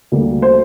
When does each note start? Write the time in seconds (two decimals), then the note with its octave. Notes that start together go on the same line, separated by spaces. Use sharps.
0.12 D2 D3 G3 A#3
0.42 C5